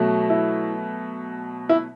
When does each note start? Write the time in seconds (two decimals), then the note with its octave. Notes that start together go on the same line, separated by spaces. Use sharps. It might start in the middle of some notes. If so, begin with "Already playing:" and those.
Already playing: B2 F#3 A3
0.30 E4
1.69 E4